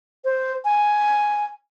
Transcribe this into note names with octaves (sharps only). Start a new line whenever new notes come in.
C5
G#5